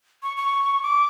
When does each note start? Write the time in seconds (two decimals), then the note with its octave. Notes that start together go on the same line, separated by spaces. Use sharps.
0.23 C#6
0.37 C#6
0.83 D6